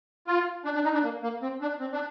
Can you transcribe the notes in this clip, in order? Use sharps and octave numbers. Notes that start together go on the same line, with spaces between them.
F4
D4
D4
D#4
D4
A#3
A#3
C4
D4
C4
D4